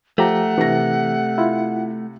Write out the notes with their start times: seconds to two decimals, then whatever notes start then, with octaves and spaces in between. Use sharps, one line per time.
0.18 F3 A3 G4 F#5 A#5
0.58 C3 E3 A#6
1.38 E4 F4